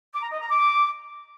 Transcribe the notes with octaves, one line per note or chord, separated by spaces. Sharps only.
D6
A#5
D#5
A#5
D6